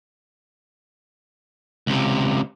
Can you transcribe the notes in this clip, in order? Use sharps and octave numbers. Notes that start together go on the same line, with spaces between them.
C#2 C3